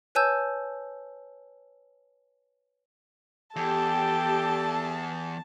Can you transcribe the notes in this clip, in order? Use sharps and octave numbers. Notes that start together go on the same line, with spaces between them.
B4 C#5 G#5 A5 E6 G6
E2 G4 A4 G5 A5